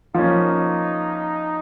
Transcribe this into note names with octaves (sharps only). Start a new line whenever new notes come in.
F3 A#3 C#4 D#4